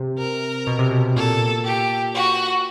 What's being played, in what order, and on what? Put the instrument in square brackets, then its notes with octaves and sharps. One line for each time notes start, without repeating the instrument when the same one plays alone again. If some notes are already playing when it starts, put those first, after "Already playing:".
Already playing: [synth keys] C3
[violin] A#4
[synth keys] B2
C3
B2
[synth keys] A#2 [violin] A4
[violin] G4
F#4